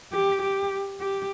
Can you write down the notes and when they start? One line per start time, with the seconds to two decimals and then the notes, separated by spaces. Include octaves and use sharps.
0.13 G4
0.42 G4
1.00 G4